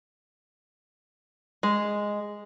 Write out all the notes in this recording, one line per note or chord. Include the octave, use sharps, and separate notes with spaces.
G#3